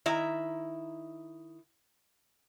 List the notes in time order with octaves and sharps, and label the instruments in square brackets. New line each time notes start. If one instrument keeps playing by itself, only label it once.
[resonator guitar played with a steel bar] D#3 E4 E5 A#5